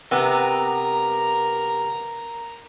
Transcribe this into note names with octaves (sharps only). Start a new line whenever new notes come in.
C3 B3 A#4 A#5